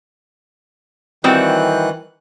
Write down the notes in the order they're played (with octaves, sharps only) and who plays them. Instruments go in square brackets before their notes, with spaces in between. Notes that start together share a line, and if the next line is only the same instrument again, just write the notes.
[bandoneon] D#3 E3 F#6 [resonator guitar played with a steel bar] G3 C4 F#4